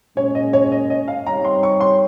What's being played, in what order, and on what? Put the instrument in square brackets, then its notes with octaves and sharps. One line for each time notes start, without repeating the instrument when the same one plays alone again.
[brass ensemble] A#2 G#3 C#4 [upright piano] C#5
[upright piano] D#5
C#5
D#5
D#5
F5
[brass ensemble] G3 C4 D#4 G4 C#5 [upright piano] A#5
[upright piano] C6
C#6
C6